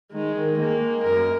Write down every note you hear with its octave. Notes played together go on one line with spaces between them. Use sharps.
D#3 G#3
D#3
G#3 A#3
G#3
F#2 A#4